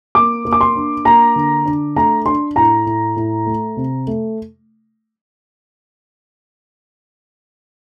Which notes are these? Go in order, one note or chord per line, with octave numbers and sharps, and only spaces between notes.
A#3 D6
A#3
D6
C6
D4
A#3 A#5
D3
D4
A3 A#5
D4 C6
A2 A#5
A2
A2
A3
C3
A3